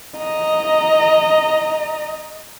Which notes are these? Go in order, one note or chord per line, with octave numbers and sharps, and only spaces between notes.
D#5 A#5